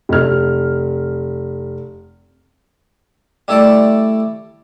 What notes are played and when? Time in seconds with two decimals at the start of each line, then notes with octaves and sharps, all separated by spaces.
0.09 F1 F6
3.48 G3 A3 E4 A4 D5